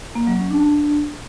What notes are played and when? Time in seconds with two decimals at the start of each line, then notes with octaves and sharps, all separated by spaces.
0.15 A#3
0.27 F#3
0.39 C#4
0.51 D4
0.63 D4